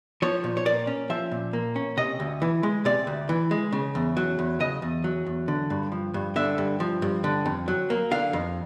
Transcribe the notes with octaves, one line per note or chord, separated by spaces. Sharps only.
F3 C#5
A#2
C#5
A#3 D5
C#4
F3 E5
A#2
A#3
C#4
C3 D#5
D2
E3
G#3
C3 D5
D2
E3
G#3
C#3
E2
F#3
E2
C#3 D#5
E2
F#3
E2
D3
G2
F3
G2
D3 E5
G2
F3
G2
D3
F2
F#3
A#3
D3 F5
F2